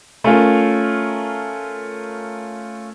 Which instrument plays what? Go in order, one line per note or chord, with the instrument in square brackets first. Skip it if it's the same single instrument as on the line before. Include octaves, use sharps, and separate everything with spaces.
[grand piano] A3 C#4 F4 A#4